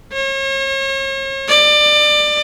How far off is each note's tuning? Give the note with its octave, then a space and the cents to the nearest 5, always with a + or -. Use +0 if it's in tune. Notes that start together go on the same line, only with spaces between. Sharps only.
C#5 -40
D5 +25